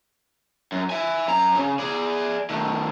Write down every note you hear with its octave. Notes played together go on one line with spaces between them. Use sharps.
F#2
E5 G#5
F#2 A#5
C#3
G#4 D5
D#3 A3